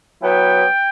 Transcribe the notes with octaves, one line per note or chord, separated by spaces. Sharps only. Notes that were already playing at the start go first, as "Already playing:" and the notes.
F#3 B3 E4 G5